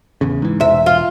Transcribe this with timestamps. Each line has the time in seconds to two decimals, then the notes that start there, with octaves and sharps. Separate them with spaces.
0.21 A1 E2 C#3
0.42 G#2 E3
0.60 E1 C3 E5
0.86 F4